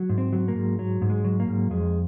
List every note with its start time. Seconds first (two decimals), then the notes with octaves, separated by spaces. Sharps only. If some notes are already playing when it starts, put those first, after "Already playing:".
Already playing: F#3
0.09 G#2
0.18 C4
0.33 F#3
0.48 A#3
0.55 G#2
0.79 F#3
1.02 G#2
1.10 G#3
1.24 F#3
1.40 A#3
1.48 G#2
1.71 F2 G#3